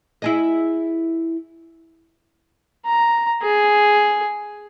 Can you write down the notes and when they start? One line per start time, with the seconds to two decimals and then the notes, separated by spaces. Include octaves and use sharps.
0.22 E4 G#4 D#5
2.86 A#5
3.42 G#4